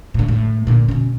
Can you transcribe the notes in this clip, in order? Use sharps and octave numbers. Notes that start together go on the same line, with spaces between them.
A2 D3
A2
A#2 D3
B2 C#4